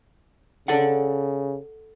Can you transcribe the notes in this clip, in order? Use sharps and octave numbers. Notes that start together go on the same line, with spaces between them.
C#3 A4 D5 F#5